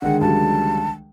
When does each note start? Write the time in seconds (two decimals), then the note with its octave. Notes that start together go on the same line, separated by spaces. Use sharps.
0.02 D3 D#3 G#3 F#5
0.21 C#2 F#3 G3 A5